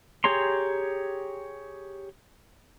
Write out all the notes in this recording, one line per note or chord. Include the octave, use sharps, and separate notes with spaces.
G4 G#4 C#5 A#5 C6